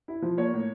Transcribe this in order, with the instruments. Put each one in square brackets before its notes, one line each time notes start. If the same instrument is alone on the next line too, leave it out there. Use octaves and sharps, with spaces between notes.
[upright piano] E4
F3
A#3 C#5
A2